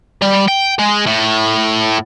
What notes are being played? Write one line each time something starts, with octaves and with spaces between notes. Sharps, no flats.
G3
G5
G#3
A2